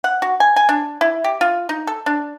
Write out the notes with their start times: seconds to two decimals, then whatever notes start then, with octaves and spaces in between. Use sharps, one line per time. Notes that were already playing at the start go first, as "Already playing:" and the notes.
0.04 F#5
0.22 F#4
0.40 G#5
0.56 G#5
0.69 D4
1.01 E4
1.24 G4
1.41 F4
1.69 D#4
1.87 A4
2.06 D4